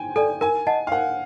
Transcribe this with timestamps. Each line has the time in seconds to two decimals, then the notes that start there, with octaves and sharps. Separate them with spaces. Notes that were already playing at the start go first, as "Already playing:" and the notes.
Already playing: G5 G#5
0.16 A4 D5 G#5
0.41 A#4 G#5
0.67 D#5 F#5 A5
0.87 F5
0.92 A#4 F#5